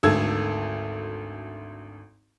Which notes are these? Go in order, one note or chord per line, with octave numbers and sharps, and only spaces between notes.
G#1 D2 A4 E6 G#6